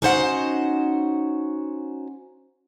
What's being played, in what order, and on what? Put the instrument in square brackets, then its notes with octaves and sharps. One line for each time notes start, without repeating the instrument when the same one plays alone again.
[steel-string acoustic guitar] C#4 D#4 F#4 C5 D#5 F#5